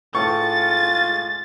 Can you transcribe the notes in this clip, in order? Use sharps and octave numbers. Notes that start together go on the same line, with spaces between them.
A2 G#3 F4 C#6 A6